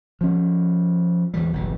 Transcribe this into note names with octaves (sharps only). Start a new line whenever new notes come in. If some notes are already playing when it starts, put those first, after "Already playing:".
F3 C#4
E2 E3 G3
F#1 B1 G2 E3